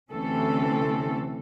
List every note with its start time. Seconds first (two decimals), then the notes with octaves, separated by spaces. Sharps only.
0.11 D2 C3 E3 C4 C#4 A4